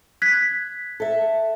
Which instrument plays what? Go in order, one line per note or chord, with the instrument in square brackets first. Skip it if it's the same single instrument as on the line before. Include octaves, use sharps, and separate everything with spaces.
[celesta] F#6 G#6 B6
[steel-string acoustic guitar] A4 E5